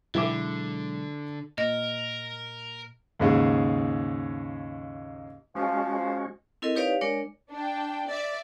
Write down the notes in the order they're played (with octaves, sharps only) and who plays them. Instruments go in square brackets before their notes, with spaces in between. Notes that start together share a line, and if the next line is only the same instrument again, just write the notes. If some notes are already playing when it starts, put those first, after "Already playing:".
[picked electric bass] B2 F#3 G#3 [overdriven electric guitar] D3 [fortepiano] E4 E5 D6
[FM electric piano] A#2 [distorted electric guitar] A#4 [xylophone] D#5
[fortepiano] D#2 G#2 C#3
[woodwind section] F3 [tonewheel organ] G#3 C#4 F#4
[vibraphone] C4 E4 A4 A#4 D#5
D#4 G4 B4 C#5 D5 F5
G#3 D4 A#4 C#5 D5
[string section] D4 G5
D5 E5